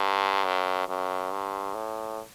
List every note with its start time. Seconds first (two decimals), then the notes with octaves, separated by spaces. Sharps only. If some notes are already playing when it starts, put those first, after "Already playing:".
Already playing: G2
0.45 F#2
0.88 F#2
1.32 G2
1.74 A2